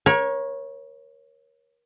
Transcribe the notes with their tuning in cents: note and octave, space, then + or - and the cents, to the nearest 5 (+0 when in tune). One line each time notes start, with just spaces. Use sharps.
A#4 +35 C#5 -10